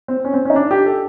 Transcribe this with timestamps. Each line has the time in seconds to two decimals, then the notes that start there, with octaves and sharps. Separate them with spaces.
0.08 C4
0.25 C#4
0.34 C4
0.45 C#4
0.50 D#4
0.56 D4
0.71 G4
0.86 A4